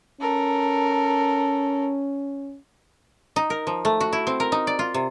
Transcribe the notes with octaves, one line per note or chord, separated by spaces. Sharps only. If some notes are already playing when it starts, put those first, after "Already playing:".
C#4 A4 A#4
D#4
A#4
F3
A3
F#4
E4
C4
A#4
D#4
D5
F4
C3